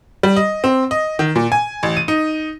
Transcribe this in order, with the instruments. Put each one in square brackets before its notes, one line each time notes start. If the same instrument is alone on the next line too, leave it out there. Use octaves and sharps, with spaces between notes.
[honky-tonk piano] G3
D#5
C4
D#5
D#3
A#2
G#5
A1
D#7
D#4